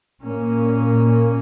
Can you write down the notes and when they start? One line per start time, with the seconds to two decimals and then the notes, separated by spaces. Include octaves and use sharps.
0.22 A#2 A#3 C#4